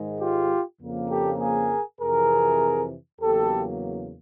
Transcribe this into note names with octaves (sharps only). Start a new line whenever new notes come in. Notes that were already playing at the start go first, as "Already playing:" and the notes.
Already playing: G#2 D#3 G#3
F4 G4
F2 C#3 F3 A#3
G4 A4
G#4 A#4
F2 C3 E3 G#4 A#4
E2 C#3 F#3 A#3 G4 A4